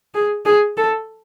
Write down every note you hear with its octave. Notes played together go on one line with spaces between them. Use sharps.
G#4
G#4
A4